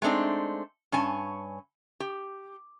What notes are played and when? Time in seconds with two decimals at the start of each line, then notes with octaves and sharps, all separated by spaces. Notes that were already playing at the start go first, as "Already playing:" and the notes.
0.02 G#3 A3 C4 D4 D#4
0.92 G2 C#4 G#5 A5
2.00 G4